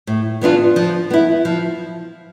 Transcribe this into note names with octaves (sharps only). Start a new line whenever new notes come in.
A2
E3 B3 D4 F4
F3
B3 E4
F3